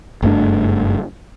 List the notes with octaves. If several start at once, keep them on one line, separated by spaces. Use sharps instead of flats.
F#1 G2 A3 D4